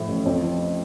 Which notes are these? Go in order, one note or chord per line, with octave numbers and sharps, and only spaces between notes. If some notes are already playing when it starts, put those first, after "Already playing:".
Already playing: A2 F3 A3
A1
F2
F3